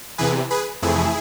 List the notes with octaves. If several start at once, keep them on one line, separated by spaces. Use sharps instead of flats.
E2 C3 E3 G#4 B4
G#4 B4
F2 C3 E3 A3 E4 G#4